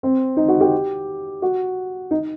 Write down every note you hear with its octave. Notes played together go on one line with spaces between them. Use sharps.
C4
D#4
F#4
G4
F#4
D#4